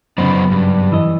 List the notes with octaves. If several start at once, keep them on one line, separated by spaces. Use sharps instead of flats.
F#2 A#2 C#3 B3 D#4 C5
G2
E3 D#5